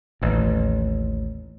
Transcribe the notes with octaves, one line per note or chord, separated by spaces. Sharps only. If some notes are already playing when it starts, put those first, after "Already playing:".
A1 D#2